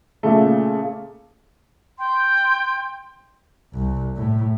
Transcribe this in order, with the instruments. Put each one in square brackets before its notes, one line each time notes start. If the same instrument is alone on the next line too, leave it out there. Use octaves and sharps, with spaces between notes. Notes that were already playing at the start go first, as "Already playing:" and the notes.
[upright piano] A#2 C#3 A3
[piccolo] G5 [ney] C6
[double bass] C2
A2